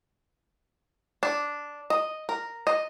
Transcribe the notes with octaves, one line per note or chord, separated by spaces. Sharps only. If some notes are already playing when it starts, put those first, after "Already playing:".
D4
D#5
A#4
D#5